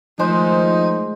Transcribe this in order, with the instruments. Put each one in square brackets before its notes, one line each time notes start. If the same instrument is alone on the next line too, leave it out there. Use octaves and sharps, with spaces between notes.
[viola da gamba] D#3 A3 [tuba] F3 [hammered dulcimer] G#3 C5 [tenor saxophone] D#4